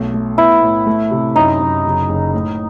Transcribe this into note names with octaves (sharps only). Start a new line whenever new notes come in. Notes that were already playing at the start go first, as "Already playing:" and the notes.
Already playing: B1 A3
A3
B3 E4
A2
A3
C3
F#2 D#4
F#2
F#1
F#1
A2